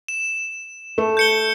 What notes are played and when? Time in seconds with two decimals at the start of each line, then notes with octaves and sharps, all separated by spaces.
0.08 E7
0.98 A3
1.17 G6 C#7 G7